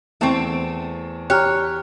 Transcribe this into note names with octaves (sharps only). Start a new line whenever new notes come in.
E2 A3 C4 A5 C#6
G4 C#5 A#5 F6 F#6